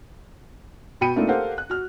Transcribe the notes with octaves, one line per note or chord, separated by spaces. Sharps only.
B2 F#4 G5 B5 C#7 D#7
A3 A#3 C4 D4 D#4 F4
G4 A4 A#4 C5 F5 F#5
F#6
F#4 F6